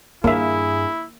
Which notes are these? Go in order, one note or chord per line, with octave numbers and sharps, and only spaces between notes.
G2 A#3 E4 G#4 E5